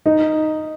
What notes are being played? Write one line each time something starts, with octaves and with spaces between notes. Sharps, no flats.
D#4